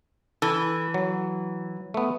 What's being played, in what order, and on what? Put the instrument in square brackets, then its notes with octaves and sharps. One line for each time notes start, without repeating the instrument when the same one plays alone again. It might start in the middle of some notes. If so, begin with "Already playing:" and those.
[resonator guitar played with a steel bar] E3 [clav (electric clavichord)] A4
[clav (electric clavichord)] F#3
A3 B3